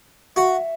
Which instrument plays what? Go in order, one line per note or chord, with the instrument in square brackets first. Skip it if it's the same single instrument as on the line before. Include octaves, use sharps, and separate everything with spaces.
[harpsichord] F#4 [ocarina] E5